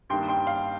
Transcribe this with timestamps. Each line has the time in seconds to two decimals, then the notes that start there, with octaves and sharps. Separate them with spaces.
0.10 G2 D#3 A#3 G5 C6
0.29 G5 C6
0.47 F5